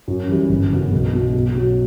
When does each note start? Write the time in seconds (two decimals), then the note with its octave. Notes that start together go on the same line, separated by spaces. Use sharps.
0.08 F#2
0.29 E3 G3
0.49 G1
0.71 F#2 C#3 E3 B3
0.92 B1
1.13 B2 F#3
1.34 B1
1.55 B2 F#3